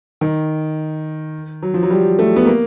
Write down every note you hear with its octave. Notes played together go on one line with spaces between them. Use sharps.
D#3
F#3
F3
F#3
G3
A3
B3
A#3